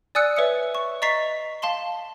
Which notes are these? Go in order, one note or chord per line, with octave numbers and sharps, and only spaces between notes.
D5 G#5 D#6 E6 F#6 C#7
B4 C#5 E5 D#6 C#7
C#6
D#5 A#5 C#6 A6 B6 C7
F5 A5 C6 G7